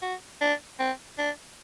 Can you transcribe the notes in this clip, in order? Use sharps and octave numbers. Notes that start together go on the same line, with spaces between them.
F#4
D4
C4
D4